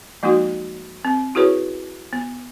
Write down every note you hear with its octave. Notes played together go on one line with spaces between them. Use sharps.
F3 G#3 A#3 D#4 F#4
C4
E4 F#4 G#4 B4 C#5
B3